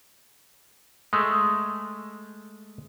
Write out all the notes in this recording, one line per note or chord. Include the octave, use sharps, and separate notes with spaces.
G#3 A3